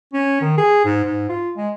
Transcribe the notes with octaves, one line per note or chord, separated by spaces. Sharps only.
C#4
D#3
G#4
G#2
G#2
F4
G#3